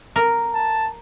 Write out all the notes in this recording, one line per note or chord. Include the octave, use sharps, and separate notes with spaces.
A#4
A5